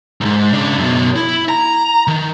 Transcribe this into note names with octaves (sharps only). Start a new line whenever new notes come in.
C2 G#2
C#3 D4
F#2 B2
E4
A#5
D#3